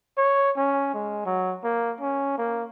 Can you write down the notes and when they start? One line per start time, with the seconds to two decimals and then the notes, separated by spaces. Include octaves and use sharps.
0.18 C#5
0.57 C#4
0.94 G#3
1.26 F#3
1.64 A#3
2.01 C#4
2.38 A#3